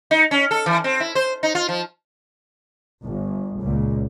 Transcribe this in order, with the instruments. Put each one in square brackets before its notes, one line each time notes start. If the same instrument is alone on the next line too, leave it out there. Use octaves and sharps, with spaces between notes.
[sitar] D#4
C#4
A4
E3
C4
E4
C5
D#4
F4
F3
[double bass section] G1
C#2 A#2